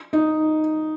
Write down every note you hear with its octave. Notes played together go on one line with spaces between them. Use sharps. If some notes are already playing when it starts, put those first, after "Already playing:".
D#4